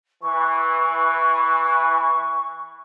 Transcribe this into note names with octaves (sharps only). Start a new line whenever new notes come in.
E3 C#6